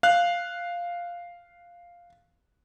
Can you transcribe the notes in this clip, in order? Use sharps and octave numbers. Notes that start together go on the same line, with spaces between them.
F5 F#6